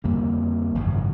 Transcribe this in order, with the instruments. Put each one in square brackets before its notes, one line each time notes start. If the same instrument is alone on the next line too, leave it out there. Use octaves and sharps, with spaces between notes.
[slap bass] F2 D3 G3 A#3
G#1 F#2 C#3 F3